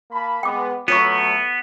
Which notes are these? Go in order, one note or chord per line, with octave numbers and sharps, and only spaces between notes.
A#3 A5 B5
G#3 B3 G5 D6
F#3 A3 B3 F4 C#5 C#6